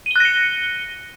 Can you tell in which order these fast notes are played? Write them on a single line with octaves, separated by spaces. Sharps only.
D#7 G7 F#6 A#6 C#7